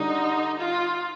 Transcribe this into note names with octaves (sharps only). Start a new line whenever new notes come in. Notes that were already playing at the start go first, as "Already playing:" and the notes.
Already playing: D3 G3 D4 D#4
F4